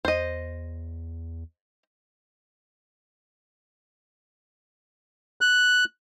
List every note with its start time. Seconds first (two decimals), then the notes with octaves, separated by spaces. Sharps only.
0.05 E2 C5 D#5
5.41 F#6